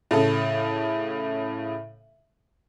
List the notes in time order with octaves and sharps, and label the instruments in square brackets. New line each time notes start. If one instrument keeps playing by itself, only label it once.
[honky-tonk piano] A2 C#3 A4